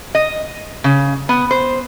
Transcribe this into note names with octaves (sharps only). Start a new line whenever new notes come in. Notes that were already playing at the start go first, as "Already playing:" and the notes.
D#5
C#3
B3
C5